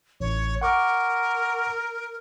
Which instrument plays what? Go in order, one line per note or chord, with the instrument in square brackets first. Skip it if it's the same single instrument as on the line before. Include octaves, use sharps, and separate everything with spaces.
[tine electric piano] A1 [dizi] C#5
[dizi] A#4 [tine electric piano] F#5 C#6 D6